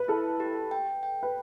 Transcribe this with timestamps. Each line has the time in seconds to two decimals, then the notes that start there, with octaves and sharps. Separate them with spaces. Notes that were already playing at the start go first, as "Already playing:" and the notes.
Already playing: B4
0.08 E4 A4
0.40 G4
0.71 G5
1.03 G5
1.23 B4